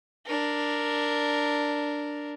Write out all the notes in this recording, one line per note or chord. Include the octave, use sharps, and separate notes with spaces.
D4 A#4